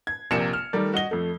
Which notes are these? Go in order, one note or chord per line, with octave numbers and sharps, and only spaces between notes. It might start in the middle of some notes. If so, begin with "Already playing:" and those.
G#6
A#1 C3 A#3 G4 C#7 E7
F6
D#3 G3 A3 A#4 D5
F#4 D#5 G7
F2 A3